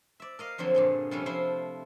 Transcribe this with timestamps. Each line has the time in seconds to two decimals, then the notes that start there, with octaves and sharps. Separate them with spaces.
0.20 D5 E5
0.39 A#4 D#5 F5
0.58 F2 D3 F3 F#3 C4
0.74 G2 A#2 G#4
1.11 C3 F3 G3 A3 C#4
1.26 F3 E4 F4 C5